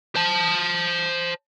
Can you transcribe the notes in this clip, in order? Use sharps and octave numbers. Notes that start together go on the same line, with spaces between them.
C5 A5